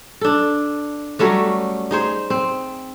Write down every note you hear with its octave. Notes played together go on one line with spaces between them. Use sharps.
D4 A4
F#3 G3 A3 C#4
D#4 G#4 C5
C4